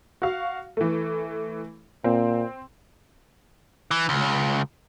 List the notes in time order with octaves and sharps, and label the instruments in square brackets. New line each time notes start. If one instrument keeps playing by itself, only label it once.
[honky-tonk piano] F#4 F5
E3 A3
[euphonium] A#2 [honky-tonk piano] C4
[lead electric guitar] E3
C#2